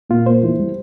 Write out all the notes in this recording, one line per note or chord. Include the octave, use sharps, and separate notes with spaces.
A#2 F4
A#3 C5
E3
G3